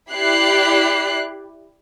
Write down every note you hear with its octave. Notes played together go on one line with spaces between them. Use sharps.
E4 G4 D5 F#6 C7